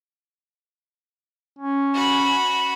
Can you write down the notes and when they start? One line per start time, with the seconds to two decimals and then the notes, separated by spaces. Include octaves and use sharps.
1.59 C#4
1.94 F#4 B5